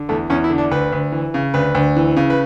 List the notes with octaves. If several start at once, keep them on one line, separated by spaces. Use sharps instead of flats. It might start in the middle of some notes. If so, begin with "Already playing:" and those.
Already playing: D3
E2 A3
E2 C#4
E4
D3
D4
D2 B4
D2
E3
C#3
D2 B4
D2
E3
C#3
B4